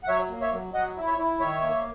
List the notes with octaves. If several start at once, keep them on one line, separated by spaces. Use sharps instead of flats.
F#5
F#3 C#5 E5
A#3
C#5 E5
F#3
F#3 D#5 F#5
E4
C#5 E5
E4
D#3 C#5 E5
A#3